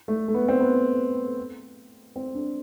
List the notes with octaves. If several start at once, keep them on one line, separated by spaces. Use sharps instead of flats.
A3
A3
B3
C4
B3
C4
D4